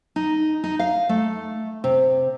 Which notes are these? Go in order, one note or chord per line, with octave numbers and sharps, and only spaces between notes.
D#4
D#4
F5
A3
C3